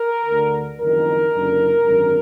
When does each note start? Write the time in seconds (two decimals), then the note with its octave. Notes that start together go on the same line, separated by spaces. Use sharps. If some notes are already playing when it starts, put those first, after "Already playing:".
Already playing: A#4
0.26 D2 D3
0.77 F#1 F2 D#3 A#4
1.30 F#1 F#2 D3
1.82 G#1 F#2 D3